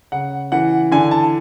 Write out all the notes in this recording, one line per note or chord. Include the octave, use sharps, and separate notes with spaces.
C#3 F#5
E3 F#5
D3 G#5
A5